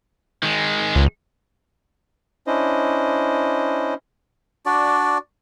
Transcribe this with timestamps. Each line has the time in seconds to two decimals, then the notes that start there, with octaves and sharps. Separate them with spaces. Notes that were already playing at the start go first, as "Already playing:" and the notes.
0.43 D#3 G#3
0.96 C#2
2.47 C#4 D4 E4 C5 D#5
4.66 D4 F#4 D5